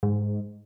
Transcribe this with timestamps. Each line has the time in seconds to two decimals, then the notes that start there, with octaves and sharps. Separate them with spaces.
0.03 G#2